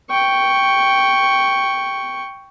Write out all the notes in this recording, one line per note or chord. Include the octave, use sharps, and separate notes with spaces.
G5 C#6